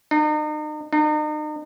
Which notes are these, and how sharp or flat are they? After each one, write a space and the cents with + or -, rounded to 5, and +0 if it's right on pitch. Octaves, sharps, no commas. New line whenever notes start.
D#4 -40
D#4 -40